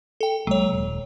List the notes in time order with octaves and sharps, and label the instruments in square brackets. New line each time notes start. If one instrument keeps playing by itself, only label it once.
[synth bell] A4 G5
[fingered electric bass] C2 G#3 A#3 [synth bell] F#3 C#5
[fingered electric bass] D#1